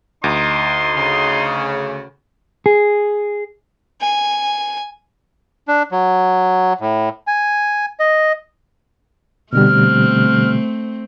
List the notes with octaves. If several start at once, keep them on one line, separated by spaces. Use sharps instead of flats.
D2 D#4 C6
C#3
G#4
G#5
D4
F#3
A2
G#5
D#5
B2 D3 G3 A3 C4 F6